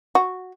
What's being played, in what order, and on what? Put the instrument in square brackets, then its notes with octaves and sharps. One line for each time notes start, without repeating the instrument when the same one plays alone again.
[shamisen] F#4